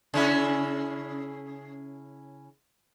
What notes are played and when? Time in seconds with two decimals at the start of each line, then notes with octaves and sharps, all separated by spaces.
0.14 C#3 C#4 E4